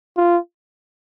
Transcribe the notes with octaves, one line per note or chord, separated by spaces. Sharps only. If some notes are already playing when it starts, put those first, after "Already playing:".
F4